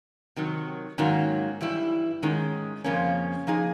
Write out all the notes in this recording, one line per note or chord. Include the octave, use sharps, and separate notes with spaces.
C3 D#3 F#3
G#2 D#3 F#3 A#3 C#4
G2 E3 G3 E4
G#2 D#3 G#3 C#4
F2 C#3 F3 A#3 C#4
F3 A#3 D#4 G#4